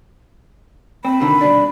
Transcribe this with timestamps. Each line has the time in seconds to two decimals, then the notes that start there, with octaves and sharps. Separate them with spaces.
1.05 C4 B5
1.20 B2 D3 D#3
1.41 C2 B2 D4